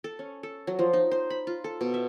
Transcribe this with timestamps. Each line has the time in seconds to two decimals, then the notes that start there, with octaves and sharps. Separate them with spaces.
0.04 A4
0.19 C#4
0.43 A4
0.67 F#3
0.79 F3
0.93 D#4
1.11 C5
1.30 B5
1.47 F4
1.64 A4
1.81 B2
1.94 E5